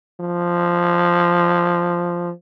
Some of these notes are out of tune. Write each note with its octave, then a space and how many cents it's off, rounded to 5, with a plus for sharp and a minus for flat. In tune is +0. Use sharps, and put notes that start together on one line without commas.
F3 -5